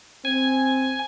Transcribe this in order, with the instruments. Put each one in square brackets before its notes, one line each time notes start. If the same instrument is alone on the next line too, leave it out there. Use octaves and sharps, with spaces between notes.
[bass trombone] C4 [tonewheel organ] G#5